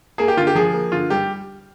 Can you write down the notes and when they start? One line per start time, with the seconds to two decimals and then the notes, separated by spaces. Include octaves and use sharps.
0.18 A#3 G#4
0.28 G4
0.37 D3 F4
0.47 G4
0.55 F3 G#4
0.74 A#3
0.92 D3 F4
1.10 G3 G4